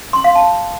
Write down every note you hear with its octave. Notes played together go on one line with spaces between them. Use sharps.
C6
F5
A5